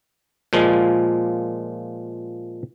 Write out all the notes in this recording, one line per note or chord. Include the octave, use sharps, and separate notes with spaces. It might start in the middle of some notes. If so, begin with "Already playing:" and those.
A#2 F3 G#3